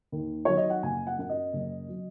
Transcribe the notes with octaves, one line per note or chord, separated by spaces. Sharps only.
D#2
D#3 F#3 C#5
D#5
F#5
F#1 G#5
F#5
F#2 F#3 F#5
D#5
F#1
F#3